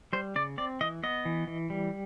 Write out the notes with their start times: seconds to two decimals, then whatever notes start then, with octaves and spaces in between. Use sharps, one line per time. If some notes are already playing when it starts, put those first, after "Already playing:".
0.13 G3 C5
0.36 C#3 D5
0.58 C4 D5
0.81 E3 D#5
1.03 B3 D#5
1.25 E3
1.47 E3
1.70 G3